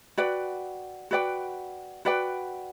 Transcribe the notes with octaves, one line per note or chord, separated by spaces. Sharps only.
F#4 B4 D5 G5
F#4 B4 D5 G5
F#4 B4 D5 G5